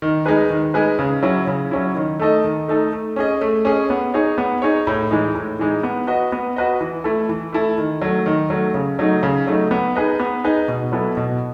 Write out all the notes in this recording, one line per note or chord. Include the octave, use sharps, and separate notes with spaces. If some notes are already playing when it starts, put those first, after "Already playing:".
D#3
G#3 D#4 G#4 B4
D#3
G#3 D#4 G#4 B4
C#3
F#3 C#4 E4
C#3
F#3 C#4 E4
D#3
A3 D#4 A4 D#5
D#3
A3 D#4 A4 D#5
A3
C#4 G#4 D#5
A3
C#4 G#4 D#5
B3
D#4 G#4 C#5
B3
D#4 G#4 C#5
A2
E3 G#3 D#4
A2
E3 G#3 D#4
B3
F#4 B4 D#5
B3
F#4 B4 D#5
E3
A3 E4 A4
E3
A3 E4 A4
D#3
F#3 A3
D#3
F#3 A3
C#3
F#3 A3 D#4
C#3
F#3 A3 D#4
B3
D#4 G#4 B4 D#5
B3
D#4 G#4 B4 D#5
B2
F#3 B3 E4 A4
B2